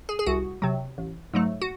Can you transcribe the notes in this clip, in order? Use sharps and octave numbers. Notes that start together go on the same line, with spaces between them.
G#4
G#4
C2 F#4
C3 F#3
A1
G#2 F#3 A3
F#4